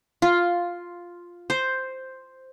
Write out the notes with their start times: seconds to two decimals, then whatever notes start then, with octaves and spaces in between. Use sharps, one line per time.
0.22 F4
1.50 C5